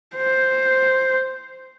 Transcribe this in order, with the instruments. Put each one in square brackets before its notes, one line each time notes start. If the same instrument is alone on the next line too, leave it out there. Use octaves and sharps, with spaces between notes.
[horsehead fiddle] C5